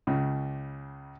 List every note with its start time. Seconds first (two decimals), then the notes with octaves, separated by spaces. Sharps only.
0.07 C#2 C#3